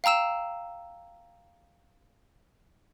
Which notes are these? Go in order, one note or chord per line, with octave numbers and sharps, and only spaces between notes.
F5 G5 A#5 E6 E7